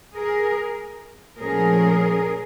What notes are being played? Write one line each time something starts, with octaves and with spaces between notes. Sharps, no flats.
G#4 A#4
A#2 F3 A3 C#4 G#4 A#4